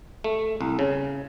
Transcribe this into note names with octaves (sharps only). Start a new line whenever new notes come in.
A3
C2
C#3